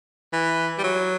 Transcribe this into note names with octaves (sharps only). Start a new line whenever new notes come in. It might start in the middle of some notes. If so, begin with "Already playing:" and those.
E3
G3
F#3